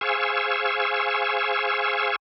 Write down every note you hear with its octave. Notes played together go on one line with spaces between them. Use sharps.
G#4 C5 F5 G#5 C#6 E6